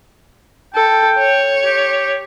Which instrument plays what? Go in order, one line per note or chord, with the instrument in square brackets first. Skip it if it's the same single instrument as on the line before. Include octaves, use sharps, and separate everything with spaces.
[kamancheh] A4 [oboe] G5
[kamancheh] C#5
[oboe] G4